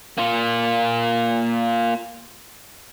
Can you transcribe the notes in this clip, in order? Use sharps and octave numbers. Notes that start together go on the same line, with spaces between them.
A#3 F4